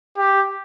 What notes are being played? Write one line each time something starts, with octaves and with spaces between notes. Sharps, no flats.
G4